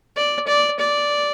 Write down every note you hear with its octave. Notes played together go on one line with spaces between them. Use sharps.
D5
D5
D5